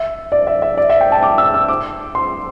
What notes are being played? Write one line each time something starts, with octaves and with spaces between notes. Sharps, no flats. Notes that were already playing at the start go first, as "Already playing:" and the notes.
Already playing: E5
D5
E5
E5
D5
E5
G5
A5
D6
E6
E6
D6
C6